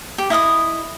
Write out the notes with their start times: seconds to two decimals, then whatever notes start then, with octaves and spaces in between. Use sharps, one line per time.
0.18 G4
0.30 E4 D#5 F5 D#6